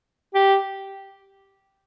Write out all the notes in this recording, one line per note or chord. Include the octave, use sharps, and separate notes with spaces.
G4